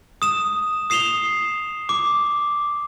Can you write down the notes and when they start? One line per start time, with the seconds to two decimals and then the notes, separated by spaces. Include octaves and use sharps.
0.22 D#6 E7
0.90 D#6 C7 E7 F7 G7
1.89 D6